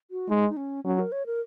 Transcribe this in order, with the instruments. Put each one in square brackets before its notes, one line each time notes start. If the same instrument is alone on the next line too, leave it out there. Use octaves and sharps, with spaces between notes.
[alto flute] F#4
[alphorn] G#3 [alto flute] D#4
[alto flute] D#4
C#4
[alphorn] F#3 [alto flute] C#4
[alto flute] A#4
C#5
A#4